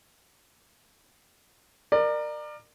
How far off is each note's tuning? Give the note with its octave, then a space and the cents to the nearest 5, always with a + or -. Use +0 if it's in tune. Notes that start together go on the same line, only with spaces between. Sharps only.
A#4 +0 D5 +30